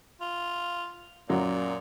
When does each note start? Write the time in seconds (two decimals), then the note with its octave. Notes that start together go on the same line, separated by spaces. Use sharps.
0.21 F4
1.29 F#2 A#2 F#3